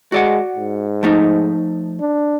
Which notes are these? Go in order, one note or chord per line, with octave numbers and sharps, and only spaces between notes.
G#3 F#4 D5 F#5
G#2
F3 A3 D#4
D4